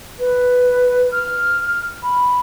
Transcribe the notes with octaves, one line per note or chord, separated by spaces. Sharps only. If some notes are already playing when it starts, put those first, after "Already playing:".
B4
F6
B5